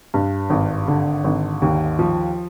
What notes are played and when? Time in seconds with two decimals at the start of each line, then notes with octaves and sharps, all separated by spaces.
0.14 G2
0.50 G#1
0.88 D3
1.24 G#1
1.62 D#2
1.99 F3